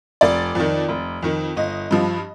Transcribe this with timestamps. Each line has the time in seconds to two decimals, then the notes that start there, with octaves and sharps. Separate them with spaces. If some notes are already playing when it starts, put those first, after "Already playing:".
0.21 F1 D5
0.55 F2 D#3
0.88 F1
1.23 F2 D#3
1.57 G1 D#5
1.91 G2 F3